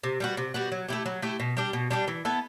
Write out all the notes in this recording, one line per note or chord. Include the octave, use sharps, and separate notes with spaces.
C3
G3 B3 F#4
C3
G3 B3 F#4
F#3
A3 E4 G4
F#3
A3 E4 G4
B2
G3 D4 G4
B2
G3 D4 G4
E3
B3 E4 A4